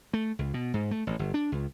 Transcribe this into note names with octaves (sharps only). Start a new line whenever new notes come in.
A3
C#2
B2
G#2
A3
A1
G1
D4
C#2